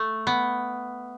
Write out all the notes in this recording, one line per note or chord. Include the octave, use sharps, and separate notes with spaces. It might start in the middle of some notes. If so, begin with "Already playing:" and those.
Already playing: A3
B3